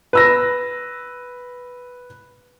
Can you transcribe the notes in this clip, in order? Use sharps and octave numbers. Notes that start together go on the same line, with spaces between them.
B4 E6 A#6